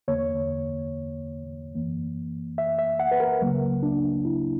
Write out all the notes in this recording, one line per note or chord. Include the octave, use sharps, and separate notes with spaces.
E2 D3 A#3 C#5
F#2 E3 A#3
E5
E5
F#5
B4
A#4
C#2 C#3 F#3 A#3
D4
E4